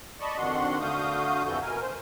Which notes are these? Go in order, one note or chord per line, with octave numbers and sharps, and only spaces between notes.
D5 D#5 A5 B5 C#6
F2 D#3 D4 F#4 F#5 C6
D3 A3 F#4 F5 D#6 G6
F2 C3 E3 F#4 A4 G6
B2 A#4 G#5
C5